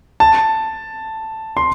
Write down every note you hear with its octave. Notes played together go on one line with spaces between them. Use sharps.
A5
C6